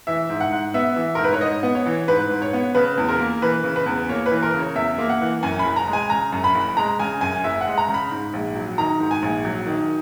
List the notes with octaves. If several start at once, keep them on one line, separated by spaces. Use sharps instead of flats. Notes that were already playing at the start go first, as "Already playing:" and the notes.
E3 E5
G#2
F#5
G#2
B3 E5
E3
G#2 A#4
B4
C#5
G#2 D#5
B3
C#5
E3
G#2 B4
G#2
C#5
B3
C#3 B4
E2
A#4
A#3
E3 B4
C#3
B4
E2
A#3 C#5
B4
E3
A#4
C#3
C#5
E2 E5
A#3
F#5
E3
F#2 G#5
B5
F#1
A#5
G#3
G#5
C#3 A#5
F#2
B5
F#1
G#3 A#5
C#3 G#5
F#2 G#5
F#1 E5
F#5
G#3
A#5
C#3
B5
G#2
A#1
F#3
D#3 A#5
G#2
G#5
A#1
F#3
D#3